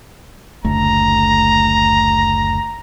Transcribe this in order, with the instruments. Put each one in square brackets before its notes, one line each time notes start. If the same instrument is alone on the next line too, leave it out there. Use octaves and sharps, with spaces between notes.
[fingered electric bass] F#1 D2 A3 [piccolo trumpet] A#5